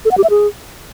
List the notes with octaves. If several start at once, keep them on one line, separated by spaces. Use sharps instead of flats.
A4
F#5
G4
E5
G#4